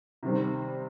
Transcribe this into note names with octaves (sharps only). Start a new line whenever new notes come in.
C3 D#3 G3 C4